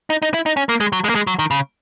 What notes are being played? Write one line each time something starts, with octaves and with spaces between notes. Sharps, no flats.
D#4
D#4
E4
D#4
C#4
A#3
G#3
F#3
G#3
A#3
G#3
F#3
D#3
C#3